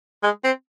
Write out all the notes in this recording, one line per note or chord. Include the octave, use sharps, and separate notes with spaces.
G#3
C4